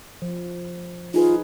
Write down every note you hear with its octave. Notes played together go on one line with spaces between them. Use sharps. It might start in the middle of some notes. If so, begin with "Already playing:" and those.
F3
D#4 F4 G#4 B4